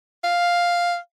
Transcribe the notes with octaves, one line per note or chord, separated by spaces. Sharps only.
F5